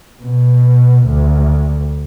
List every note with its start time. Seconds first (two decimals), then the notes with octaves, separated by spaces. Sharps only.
0.23 B2
1.07 D2